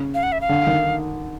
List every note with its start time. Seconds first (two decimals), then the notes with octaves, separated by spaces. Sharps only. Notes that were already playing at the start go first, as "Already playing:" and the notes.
Already playing: C#3
0.14 F5
0.23 F#5
0.32 E5
0.41 F5
0.49 D3
0.67 D#3